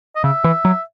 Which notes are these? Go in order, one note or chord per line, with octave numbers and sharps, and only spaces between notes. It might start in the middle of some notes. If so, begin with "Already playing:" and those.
D#5
C#3 E5
E3
F#3